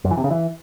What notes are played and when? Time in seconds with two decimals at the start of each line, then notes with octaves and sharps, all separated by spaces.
0.04 F#2
0.11 E3
0.17 C3
0.24 C#3
0.31 E3